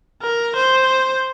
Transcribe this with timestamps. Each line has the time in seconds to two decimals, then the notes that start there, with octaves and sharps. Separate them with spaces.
0.22 A#4
0.56 C5